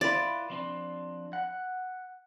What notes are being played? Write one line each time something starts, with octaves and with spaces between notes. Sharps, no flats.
E4 F4 B4 D5
F3 C4 D4
F#5